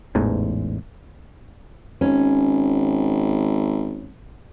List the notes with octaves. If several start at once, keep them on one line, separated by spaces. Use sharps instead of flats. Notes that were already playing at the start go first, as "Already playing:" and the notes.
A1 E2 G#2
G#1 C#4